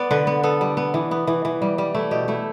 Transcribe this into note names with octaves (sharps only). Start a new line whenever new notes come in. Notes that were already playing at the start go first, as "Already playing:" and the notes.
Already playing: B3 D5
D3 B4
B3
B3 A4
G3
B3
E3
B3
E3
E3
G3
G3
A3 E4
B2 G4
A3 E4